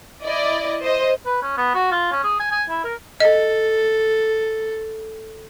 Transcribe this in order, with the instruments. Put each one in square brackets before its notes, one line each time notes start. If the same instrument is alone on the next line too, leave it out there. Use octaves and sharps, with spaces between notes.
[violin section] E4 D5 D#5
C5 D#5
[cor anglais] B4
C#4
B3
F#4
F4
C#4
G#4
G#5
G#5
E4
A#4
[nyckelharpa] A4 [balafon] D#5